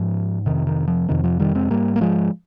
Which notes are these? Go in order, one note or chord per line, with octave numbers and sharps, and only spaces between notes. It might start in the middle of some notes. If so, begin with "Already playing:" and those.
Already playing: G#2 F3
F2 C3 D#3
D#3
F3
F2 C3 D#3
F3
D#3 G3
G#3 C4
G#2 G3 A#3
A#3
F3 G#3